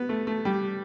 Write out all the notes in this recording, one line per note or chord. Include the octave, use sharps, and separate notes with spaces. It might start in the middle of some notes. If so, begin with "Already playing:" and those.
Already playing: B3
A3
A3
G3